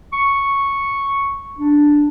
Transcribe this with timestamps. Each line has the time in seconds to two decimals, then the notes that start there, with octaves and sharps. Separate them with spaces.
0.13 C#6
1.59 D4